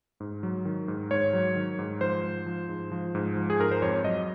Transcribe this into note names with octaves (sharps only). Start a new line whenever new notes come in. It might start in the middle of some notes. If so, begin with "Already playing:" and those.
G#2
F#3
D#3
G#2
G#2 C#5
F#3
D#3
G#2
F3 C5
G#2
F3
G#2
F3
G#2
F3
G#4
G#2 A#4
C5
F2 C#5
F#3 D#5